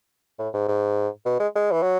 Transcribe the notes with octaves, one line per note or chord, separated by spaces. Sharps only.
A2
G#2
G#2
B2
G#3
G#3
E3
F#3